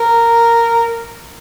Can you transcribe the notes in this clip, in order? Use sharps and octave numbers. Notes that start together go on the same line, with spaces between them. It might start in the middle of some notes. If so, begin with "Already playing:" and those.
Already playing: A#4